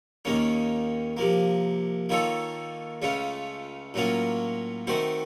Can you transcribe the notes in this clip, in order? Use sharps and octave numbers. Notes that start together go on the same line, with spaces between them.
D#2 D#3 A#3 C#4
C3 F3 A#3
D#3 A#3 F4 A4 C#5
C#2 C#3 A3 C#4 F4
A2 F#3 A#3 C#4 F4
D#3 A3 C4 F#4 C5